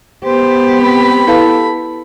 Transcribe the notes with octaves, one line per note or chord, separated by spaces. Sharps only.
B3 G4 C5
C4 B5
E4 A4 B4 F5